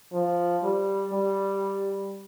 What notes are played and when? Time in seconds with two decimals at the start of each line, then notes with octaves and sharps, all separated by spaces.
0.13 F3
0.63 G3
1.13 G3